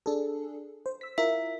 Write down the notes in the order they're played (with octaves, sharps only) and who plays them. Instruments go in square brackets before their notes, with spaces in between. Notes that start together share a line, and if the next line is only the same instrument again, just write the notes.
[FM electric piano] D4 G#4 A4
C5
E6 B6
[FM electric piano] E4 F4 A#4 [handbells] E5